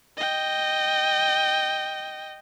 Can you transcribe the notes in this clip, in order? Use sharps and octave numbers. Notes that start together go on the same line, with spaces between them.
D#5 G5